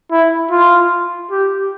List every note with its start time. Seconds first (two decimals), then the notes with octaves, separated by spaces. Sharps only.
0.11 E4
0.51 F4
1.31 G4